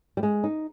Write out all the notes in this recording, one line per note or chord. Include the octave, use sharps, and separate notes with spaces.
G3
G#3
D#4